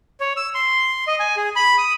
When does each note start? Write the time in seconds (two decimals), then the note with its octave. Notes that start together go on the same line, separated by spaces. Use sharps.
0.20 C#5
0.37 E6
0.55 C6
1.07 D#5
1.20 G#5
1.37 G#4
1.56 B5
1.78 D#6